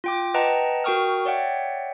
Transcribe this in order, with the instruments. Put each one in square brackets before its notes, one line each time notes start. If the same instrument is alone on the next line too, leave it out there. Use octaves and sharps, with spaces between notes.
[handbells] F4 G5 D6
B4 D#5 F#5 G5 A5 A#5
F#4 A#4 G5 C#6 D#6 F6
C#5 D5 E5 F#5 G5